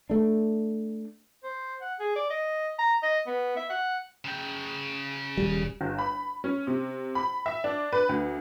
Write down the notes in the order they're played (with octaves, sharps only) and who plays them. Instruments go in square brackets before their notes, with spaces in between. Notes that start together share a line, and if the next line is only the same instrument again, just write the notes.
[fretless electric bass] A3 D4
[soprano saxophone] C5
F#5
G#4
D5
D#5
A#5
D#5
B3
E5
F#5
[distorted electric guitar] C#3 G5
[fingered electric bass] D#1 G3
[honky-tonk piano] G1
B5
C#4
C3
B5
E5
D4
B4
D2